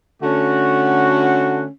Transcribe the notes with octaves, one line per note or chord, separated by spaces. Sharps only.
D3 A3 C#4 F#4